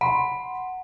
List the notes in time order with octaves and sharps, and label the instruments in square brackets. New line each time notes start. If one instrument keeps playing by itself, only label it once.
[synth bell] F#5 [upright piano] B5 C6